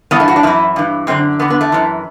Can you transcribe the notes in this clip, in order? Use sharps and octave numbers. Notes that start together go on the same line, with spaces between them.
G2 E3 B3
A3
F#4
D4
F#2 E3 E4
G2 E3
F#2 D3 C4
E2 D3 B3
B3
A3
F#2 E3